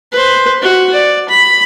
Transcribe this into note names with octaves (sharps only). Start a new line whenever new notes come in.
B4 C5
F#4
D5
B5